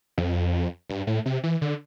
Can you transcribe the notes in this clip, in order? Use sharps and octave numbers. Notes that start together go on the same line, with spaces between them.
F2
G2
A2
C3
E3
D3